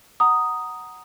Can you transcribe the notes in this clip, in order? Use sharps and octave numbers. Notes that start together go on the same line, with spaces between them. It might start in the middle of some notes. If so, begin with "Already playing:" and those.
F#5 A#5 D#6